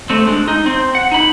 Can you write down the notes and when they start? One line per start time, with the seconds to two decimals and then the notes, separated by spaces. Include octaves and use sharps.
0.10 A3 C4
0.27 G#3 D4
0.48 D#4
0.66 C4
0.95 F#5
1.12 D#4 B5